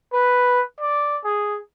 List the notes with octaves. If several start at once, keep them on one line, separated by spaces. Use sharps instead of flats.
B4
D5
G#4